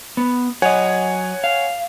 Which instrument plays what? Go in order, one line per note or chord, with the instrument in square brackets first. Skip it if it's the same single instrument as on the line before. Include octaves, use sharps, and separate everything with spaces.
[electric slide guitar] B3
[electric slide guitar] F#3 D#5 [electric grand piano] C#5 F#5 G#5
[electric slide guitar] F5